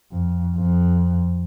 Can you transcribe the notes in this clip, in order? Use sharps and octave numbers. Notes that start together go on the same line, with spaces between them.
F2
F2